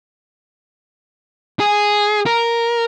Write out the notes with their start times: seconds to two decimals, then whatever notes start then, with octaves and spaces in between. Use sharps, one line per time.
1.60 G#4
2.26 A#4